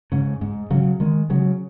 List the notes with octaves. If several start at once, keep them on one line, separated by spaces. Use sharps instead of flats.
G#2 C#3
G#2
C#3 F#3
D#3 G#3
C#3 F#3